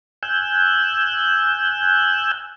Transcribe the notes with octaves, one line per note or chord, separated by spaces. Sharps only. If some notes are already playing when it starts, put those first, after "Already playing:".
G#5 E6 F#6 G6